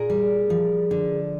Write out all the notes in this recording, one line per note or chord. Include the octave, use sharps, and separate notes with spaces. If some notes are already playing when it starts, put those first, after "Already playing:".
Already playing: A#2 G#4 A#4
G3
F3
D3